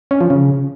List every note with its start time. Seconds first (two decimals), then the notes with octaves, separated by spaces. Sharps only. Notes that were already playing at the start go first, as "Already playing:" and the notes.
0.11 C#4
0.21 F3
0.30 C#3